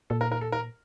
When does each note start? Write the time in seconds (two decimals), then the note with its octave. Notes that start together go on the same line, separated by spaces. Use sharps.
0.10 A#2 A4
0.21 A#4
0.32 A#4
0.41 A4
0.52 A#4